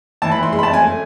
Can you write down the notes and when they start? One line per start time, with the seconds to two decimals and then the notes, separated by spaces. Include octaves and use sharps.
0.22 E3 A5
0.32 B5
0.38 E3 C6
0.52 G#3 C6
0.59 B5
0.63 A5
0.67 F2
0.74 G#5
0.84 A3